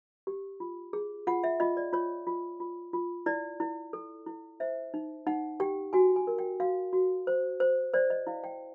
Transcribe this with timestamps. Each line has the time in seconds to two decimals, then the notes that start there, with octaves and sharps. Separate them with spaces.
0.27 G4
0.60 F4
0.93 G#4
1.27 F4 F#5
1.44 E5
1.60 F4 D#5
1.77 D5
1.93 F4 C#5
2.27 F4
2.60 F4
2.93 F4
3.26 E4 D5
3.60 E4
3.93 A4
4.26 E4
4.60 C5 E5
4.94 D#4
5.27 D#4 F#5
5.60 G4 G5
5.93 F#4 G#5
6.16 G#5
6.27 A#4
6.38 G5
6.60 F#4 F5
6.93 F#4
7.27 C5
7.60 C5
7.93 C5 D5
8.10 D#5
8.27 E4 F5
8.44 G5